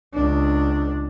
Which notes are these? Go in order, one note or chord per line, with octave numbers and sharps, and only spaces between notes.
C#2 D4